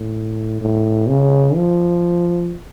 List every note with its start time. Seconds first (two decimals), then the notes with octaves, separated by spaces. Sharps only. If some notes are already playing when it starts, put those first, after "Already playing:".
Already playing: A2
0.61 A2
1.09 C#3
1.56 F3